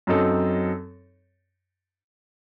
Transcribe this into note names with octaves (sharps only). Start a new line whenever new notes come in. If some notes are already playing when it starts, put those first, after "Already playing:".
F#2 F#3 C4 D#4 A4